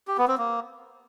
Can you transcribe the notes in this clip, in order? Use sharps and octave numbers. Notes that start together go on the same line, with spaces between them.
G4
B3
C4
A#3